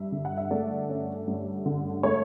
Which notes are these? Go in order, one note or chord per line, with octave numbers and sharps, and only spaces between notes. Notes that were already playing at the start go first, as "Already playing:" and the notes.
Already playing: G2 E5
D3
F#5
E5
A3 D5
C#4
G2
D3
A3 C#5